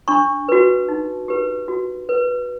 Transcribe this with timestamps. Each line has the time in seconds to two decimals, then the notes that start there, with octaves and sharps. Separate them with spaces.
0.08 D4 C#6
0.49 F#4 B4
0.89 D#4
1.28 G4 B4
1.68 F#4
2.09 B4